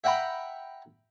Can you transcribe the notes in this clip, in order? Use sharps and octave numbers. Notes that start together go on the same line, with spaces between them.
E5 F#5 G5 A#5 B5